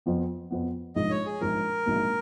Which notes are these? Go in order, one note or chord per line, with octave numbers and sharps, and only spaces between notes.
F2 F3 B3
F2 F3 B3
A#1 G#2 F3 D#5
C#5
G#4
A#1 G#2 F3 A#4
A#1 G#2 F#3 A#3